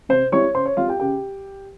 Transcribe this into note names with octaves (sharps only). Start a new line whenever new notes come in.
C3 C5 C6
G3 C4 E4 C#5 C#6
C#3 C5 C6
C#5
G3 C4 F4 F5
G4 G5
C#3 G4 G5